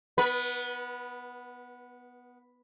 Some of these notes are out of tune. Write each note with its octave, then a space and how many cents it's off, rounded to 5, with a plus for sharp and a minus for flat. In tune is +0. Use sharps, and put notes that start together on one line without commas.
B3 +0 B4 -30